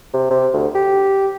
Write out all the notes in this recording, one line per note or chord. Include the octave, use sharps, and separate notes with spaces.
C3
C3
D2
G4